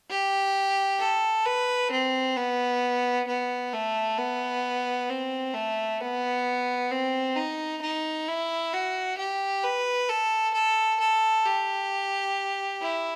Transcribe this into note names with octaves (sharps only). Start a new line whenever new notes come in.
G4
A4
B4
C4
B3
B3
A3
B3
C4
A3
B3
C4
D#4
D#4
E4
F#4
G4
B4
A4
A4
A4
G4
E4